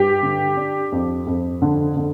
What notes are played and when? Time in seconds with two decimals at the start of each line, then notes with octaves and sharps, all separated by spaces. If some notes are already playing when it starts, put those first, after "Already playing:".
Already playing: G2 G4
0.23 D3
0.57 D4
0.92 F2
1.27 F2
1.62 D3
1.97 D3